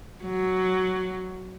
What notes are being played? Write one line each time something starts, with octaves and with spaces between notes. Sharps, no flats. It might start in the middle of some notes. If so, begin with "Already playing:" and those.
F#3